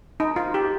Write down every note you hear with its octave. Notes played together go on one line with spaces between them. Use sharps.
D#4
F4
G4